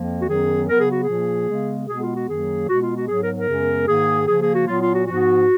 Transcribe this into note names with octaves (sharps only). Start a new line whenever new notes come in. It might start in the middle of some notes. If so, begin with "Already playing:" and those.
Already playing: F2 F3 A#3
F#4
F#2 D#3 F#3 B3 G#4
C#3 F#3 B3 A#4
G#4
F#4
G#4
A#2 F3 A#3
C#3 G#3 B3
B2 G#3 B3 G#4
F4
F#4
F#2 D#3 F#3 A#3 G#4
B2 G#3 B3 F#4
F4
F#4
G#2 F#3 B3 G#4
A#4
A#4
F#2 C#3 G#3 B3
G#2 D#3 A#3 G#4
C#3 F3 A#3 G#4
G#4
F#4
A#2 F#3 B3 F4
F4
F#4
G#2 F3 B3 F#4